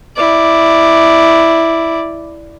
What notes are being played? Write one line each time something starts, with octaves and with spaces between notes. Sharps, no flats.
E4 D5